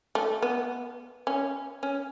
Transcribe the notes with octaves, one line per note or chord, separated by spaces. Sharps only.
A3
B3
C#4
C#4